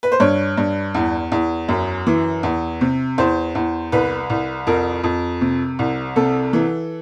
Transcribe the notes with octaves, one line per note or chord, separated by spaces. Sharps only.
B4
C5
G2 C#5
G2
E2
E2
F#2
E3
E2
C3
E2 C5
E2
C2 B4
C2
F2 A#4
F2
C3
C2
C3 A4
E3